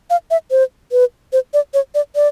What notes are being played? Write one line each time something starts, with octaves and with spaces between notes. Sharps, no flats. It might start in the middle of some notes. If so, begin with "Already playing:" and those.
F5
E5
C5
B4
C5
D5
C#5
D5
D5